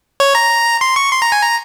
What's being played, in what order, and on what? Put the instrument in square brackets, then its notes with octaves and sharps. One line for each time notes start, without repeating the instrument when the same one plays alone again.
[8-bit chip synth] C#5
A#5
C6
C#6
C6
A#5
G#5
A#5